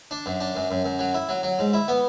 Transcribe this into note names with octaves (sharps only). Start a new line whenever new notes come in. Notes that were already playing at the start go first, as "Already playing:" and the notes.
D4
F#2
D4
F#2
F#2
F#2
F#3
E4
F#3
F#3
G#2
E4
B3